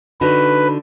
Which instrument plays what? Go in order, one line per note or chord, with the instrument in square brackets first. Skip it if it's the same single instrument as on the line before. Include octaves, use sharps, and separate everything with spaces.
[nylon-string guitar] D3 D#4 F#4 [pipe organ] B4